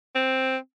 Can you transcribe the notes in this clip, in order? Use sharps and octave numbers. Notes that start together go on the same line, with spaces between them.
C4